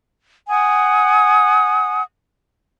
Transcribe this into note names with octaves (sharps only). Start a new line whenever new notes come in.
F#5 G#5 D#6